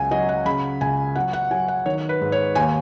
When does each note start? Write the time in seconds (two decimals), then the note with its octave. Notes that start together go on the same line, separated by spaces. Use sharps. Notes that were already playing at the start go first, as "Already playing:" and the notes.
Already playing: C#2 F#3 G#5
0.11 F#3 D#5
0.29 F#5
0.46 C#3 B5
0.81 C#2 G#5
1.16 F#3 F#5
1.33 F#5
1.51 F#3 G#5
1.68 F#5
1.86 D#3 C#5
2.09 B4
2.21 G#2
2.32 C#5
2.55 D#2 G#5